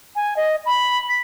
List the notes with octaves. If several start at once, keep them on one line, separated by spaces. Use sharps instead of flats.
G#5
D#5
B5
B6